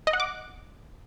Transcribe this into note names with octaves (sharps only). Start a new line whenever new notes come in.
D#5
F#5
D6